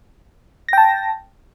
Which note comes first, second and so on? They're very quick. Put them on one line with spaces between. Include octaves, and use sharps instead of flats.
A#6 G5 A5